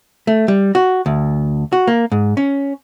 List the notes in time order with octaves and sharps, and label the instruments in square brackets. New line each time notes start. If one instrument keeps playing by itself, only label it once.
[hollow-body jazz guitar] A3
G3
F#4
D2
F#4
A#3
G#2
C#4